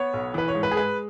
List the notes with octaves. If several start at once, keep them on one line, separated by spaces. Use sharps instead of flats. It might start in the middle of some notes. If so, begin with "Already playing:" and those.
Already playing: B3 C#5
B1
E3 B4
C#5
G#2
B4
G#4
G#3 B4